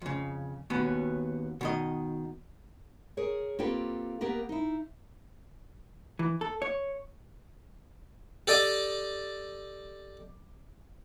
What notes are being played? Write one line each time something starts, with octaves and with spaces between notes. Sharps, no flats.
F2 C#3
D#2 B2 B3 C#4
B2 D#3 D#5
G#4 A#4 C#5
A#3 C4 F4 G4 A4 B4
A#3 B3 G4 A#4 B4
D#4 E4
E3
A4
C#5
G4 A4 D5 D#5